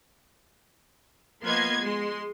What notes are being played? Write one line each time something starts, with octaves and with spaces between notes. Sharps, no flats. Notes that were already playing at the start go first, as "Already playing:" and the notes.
F3 A#3 B3 D#5 C6 G#6
G#3 C6